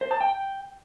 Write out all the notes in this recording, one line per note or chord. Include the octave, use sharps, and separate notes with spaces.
C5
A5
G5